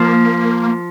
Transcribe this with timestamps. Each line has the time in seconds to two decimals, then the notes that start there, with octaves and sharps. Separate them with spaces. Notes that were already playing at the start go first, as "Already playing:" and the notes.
Already playing: F3 A#3